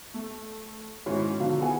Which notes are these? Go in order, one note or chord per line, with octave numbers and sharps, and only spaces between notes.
A3
G#2 B2 D#3 C#4 E4 F#4
B2 D3 D#3 F3 D#4 F5
B3 E4 G#4 F#5 G#5